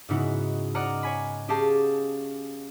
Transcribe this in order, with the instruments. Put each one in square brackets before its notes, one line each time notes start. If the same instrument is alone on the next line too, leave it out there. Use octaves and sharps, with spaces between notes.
[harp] G#2 C#3 B3 D#4 E4 F#4
D5 D#5 F#5 A#5 F6
C#5 G#5 B5
C#4 G4 G#4 F5 A5 A#6